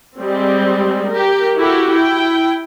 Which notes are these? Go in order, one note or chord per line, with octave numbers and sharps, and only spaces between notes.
G3 G#3 C4
G4 A#4
E4 F#4 G4 A4
E4 G5